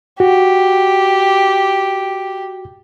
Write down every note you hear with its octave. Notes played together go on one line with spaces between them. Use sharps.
F#4 G4